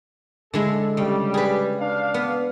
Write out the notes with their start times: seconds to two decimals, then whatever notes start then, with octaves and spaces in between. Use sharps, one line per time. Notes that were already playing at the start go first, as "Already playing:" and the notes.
0.54 D3 G#3 E4 A4
0.97 C#3 G3
1.34 G#4 B4
1.79 D4 F5
2.14 B3